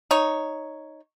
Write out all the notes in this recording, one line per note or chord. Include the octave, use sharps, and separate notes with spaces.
D#4 C#5